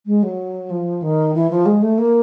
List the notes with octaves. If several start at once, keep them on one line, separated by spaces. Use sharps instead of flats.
G#3
F#3
F3
D#3
E3
F3
G#3
A3
A#3